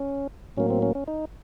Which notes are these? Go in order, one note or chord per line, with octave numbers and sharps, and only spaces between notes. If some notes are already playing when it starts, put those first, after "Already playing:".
Already playing: C#4
A2 F#3 A#3 C#4
C4
C#4
C#4
D#4